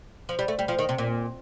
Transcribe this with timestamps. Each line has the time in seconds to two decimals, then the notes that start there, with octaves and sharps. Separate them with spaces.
0.29 F3
0.39 G3
0.48 A3
0.59 G3
0.68 F3
0.79 D#3
0.89 C3
0.98 A#2